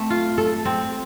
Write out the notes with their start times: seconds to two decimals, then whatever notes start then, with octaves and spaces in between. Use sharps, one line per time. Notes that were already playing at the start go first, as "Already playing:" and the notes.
Already playing: A3 C4
0.10 F4
0.38 A4
0.65 C4